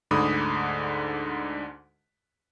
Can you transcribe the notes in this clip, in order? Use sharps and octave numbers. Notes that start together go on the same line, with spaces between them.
D2 G#2 D3 B5 D6 D#6